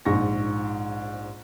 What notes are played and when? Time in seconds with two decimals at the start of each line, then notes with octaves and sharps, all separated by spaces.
0.05 A#1 G#2 C#6 A#6